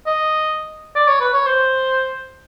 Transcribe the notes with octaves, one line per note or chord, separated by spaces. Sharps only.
D#5
D5
C#5
B4
C#5
C5